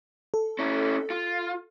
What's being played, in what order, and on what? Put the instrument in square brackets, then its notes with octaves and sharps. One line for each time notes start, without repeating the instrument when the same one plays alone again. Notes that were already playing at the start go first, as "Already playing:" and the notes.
[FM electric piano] A4
[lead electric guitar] C#4 E4
F4